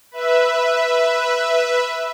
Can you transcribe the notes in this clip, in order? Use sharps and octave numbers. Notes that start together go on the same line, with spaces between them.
B4 E5